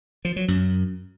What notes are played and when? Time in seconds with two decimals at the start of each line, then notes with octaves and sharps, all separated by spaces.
0.25 F3
0.36 F#3
0.48 F#2